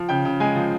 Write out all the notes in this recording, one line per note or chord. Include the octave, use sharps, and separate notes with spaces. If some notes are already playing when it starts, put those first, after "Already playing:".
Already playing: F3
C#3 G5
C#3
G#3 G#5
F3